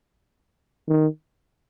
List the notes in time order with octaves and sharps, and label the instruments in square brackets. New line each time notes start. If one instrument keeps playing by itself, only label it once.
[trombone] D#3